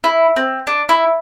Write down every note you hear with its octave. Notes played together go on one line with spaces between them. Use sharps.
E4
C4
D4
E4